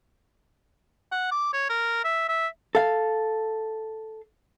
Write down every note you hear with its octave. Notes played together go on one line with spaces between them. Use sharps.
F#5
D6
C#5
A#4
E5
E5
A4 F5